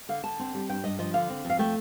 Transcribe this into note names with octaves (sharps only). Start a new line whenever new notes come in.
D3 F5
D3 A5
C4
G3
G2 G5
G2 D#5
F3 D#5
D3 F5
C4
F2 F5
A3 G5